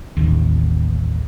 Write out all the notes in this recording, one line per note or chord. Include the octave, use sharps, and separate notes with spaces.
D#1 A1 D#2